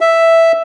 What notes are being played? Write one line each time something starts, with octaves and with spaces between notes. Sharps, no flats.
E5